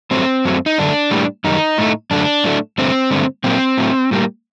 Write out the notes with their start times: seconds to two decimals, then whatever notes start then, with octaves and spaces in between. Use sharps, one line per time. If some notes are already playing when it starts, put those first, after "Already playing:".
0.11 G2 F#3 A3 C4
0.45 F#2 F#3 A3
0.66 D#4
0.78 F#2 D3 A3 D4
1.11 A2 G3 A#3
1.44 F#2 D#3 G3 D#4
1.78 A2 A3
2.11 F#2 D3 A3 D4
2.44 A2 F#3 A3
2.78 G2 D3 A3 C4
3.11 G2 D3 A3
3.44 A#2 F#3 A#3 C4
3.78 A2 F#3 A3
4.11 A2 G3 A#3